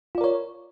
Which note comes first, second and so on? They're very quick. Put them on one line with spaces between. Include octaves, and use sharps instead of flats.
F4 D5 A#4 C#5